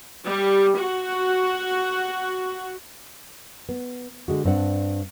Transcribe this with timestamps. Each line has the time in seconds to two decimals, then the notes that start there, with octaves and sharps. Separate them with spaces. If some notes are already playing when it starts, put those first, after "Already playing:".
0.25 G3
0.77 F#4
3.69 B3
4.28 D3 G#3 F#4
4.45 G2 C4 D4 F#5